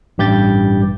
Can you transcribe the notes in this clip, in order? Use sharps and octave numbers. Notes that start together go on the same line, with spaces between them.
A1 G2 G4 G6 A6